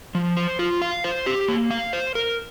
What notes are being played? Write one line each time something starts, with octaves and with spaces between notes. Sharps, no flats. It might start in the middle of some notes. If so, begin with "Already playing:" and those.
F3
C5
F4
F5
C5
G4
A#3
F5
C5
A#4